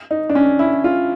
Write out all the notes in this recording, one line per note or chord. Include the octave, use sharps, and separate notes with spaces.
D#4
D4
C#4
E4
F4